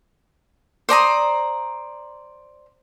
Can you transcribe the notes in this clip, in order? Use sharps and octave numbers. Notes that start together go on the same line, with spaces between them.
C5 D5 A#5 D#6